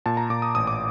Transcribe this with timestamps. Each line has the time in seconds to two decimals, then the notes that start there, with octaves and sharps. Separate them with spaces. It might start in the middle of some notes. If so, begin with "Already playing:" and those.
0.06 A#2 A5
0.17 A#5
0.30 A#2 D6
0.42 D#6
0.55 A1 D#6
0.67 D6